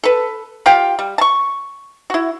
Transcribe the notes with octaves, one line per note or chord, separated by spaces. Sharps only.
A4 B4
F4 G4 F5 G5
G3
A5 C#6
E4 F#4